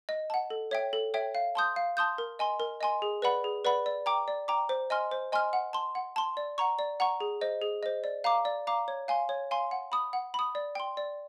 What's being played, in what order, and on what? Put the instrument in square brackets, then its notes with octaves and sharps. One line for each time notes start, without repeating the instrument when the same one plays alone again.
[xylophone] D#5
F#5 A5
A4
C#5 E5 G5
A4
C#5 E5 G5
F5
A5 C6 D#6 G6
F5
A5 C6 D#6 G6
A#4
D#5 G#5 C6
A#4
D#5 G#5 C6
G#4
B4 D5 F#5 B5
G#4
B4 D5 F#5 B5
D5
G5 A#5 D6
D5
G5 A#5 D6
C5
D#5 G#5 C6 F6
C5
D#5 G#5 C6 F6
F#5
A5 C6
F#5
A5 C6
D5
F#5 A#5 C#6
D5
F#5 A#5 C#6
G#4
C5 D#5
G#4
C5 D#5
D5
F5 A#5 D6
D5
F5 A#5 D6
C#5
F5 G#5 C6
C#5
F5 G#5 C6
F#5
B5 D#6
F#5
B5 D#6
D5
G5 C6
D5